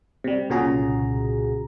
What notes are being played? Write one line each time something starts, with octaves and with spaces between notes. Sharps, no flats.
C3 G3
C2 A#2 C#3 F#4 G#4 A#5